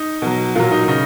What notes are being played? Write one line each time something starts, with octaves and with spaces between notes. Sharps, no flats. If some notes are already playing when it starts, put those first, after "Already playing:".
Already playing: D#4
B2 F#3
A#2 F#3 F4
D#4
C#3 D#4